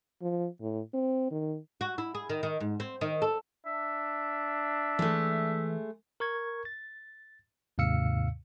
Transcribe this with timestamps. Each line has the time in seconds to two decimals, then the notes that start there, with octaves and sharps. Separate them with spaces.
0.22 F3
0.61 A2
0.94 C4
1.31 D#3
1.81 F#4
1.98 E4
2.15 G#4
2.30 D#3
2.43 D#3
2.60 G#2
2.80 C4
3.01 D#3
3.22 A4
3.66 D4 E5
4.99 E3 G#3 A3
6.20 A#4 C#6 G#6
6.65 A6
7.78 D#2 G#2 C3 F5 E6 C#7